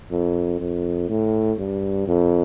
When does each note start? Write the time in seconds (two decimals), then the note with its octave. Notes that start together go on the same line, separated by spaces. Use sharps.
0.11 F2
0.60 F2
1.09 A2
1.58 G2
2.08 F2